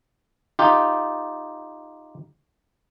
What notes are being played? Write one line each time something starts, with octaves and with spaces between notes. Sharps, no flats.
D#4 F4 G4